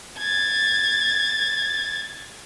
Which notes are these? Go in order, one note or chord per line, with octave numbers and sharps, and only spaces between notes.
G#6 A6